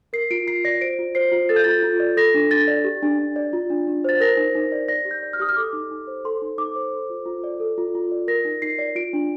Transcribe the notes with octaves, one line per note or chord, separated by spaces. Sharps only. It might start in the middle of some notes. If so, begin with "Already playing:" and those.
A#4 C7
F4 D7
F4 C7
D5 A#6
C5 D7
F4
C5 C7
F4
A4 A6
G6
F4 A6
F4
D5
A4 A#6
D4
D4 A6
D5
G4
D4
D4
D5
F4
D4
D4
C5 A6
A#4 A#6
D#4
D#4
D5
D5 A#6
G4
G6
D5
F6
G4 D#6
F6
A4 D6
D#4
D#4
C5
A4 C6
D#4
D#4 D6
C5
A4
F4
F4
D5
A4
F4
F4
D5
A#4 A#6
D#4
D#4 C7
D5
F4 D7
D4